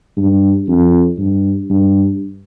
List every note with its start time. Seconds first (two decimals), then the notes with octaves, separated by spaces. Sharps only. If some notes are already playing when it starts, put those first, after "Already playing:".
0.17 G2
0.68 F2
1.18 G2
1.70 G2